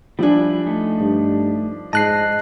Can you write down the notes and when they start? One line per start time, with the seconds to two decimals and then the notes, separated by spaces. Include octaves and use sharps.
0.19 F3 G3 D4 E4 G#5
0.67 A3 D#4
1.00 G2
1.93 G#2 D#5 A5 F#6 C7